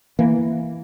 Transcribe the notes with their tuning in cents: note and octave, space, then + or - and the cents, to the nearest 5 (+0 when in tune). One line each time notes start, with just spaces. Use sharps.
E3 +0 A#3 +0